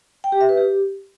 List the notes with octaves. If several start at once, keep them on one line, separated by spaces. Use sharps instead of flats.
G5
G4
E5
B4
G4